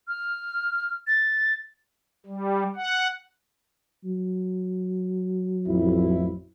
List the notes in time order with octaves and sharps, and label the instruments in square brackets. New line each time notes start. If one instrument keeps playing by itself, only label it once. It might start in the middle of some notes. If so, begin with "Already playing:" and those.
[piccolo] F6
A6
[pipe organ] G3
F#5
[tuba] F#3
[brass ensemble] A1 F2 E4